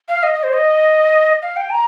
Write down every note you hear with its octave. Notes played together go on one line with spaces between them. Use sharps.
F5
D#5
D#5
C5
D#5
F5
G5
A#5